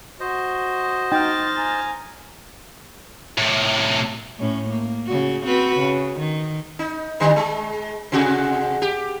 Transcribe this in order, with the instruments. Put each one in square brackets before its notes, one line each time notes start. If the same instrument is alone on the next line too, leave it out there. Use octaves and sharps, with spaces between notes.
[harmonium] F#4 [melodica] C5 D#5
[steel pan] D#4 G5 [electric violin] F6 A6
[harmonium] G#5 A#5
[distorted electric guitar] A2 C3
[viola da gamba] A2 C#4
A#3
C#3 F#4
C4 F#4 B4
C#3
D#3
[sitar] D#4
D3 G3 D#4
G#3
C3 F#4 G#4
G4